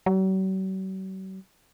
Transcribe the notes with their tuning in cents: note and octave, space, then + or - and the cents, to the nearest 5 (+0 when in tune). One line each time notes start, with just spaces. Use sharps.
F#3 +45